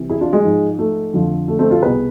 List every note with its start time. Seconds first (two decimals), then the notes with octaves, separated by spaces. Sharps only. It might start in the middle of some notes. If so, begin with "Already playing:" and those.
Already playing: C2 C3 E3
0.10 E4 G#4
0.21 D4 F4
0.33 G#3
0.44 G#2 F3
0.79 A3
1.13 F2 D3 F3
1.48 A3
1.59 A3 C4
1.71 F4 A4
1.82 C2 B2 G#4 B4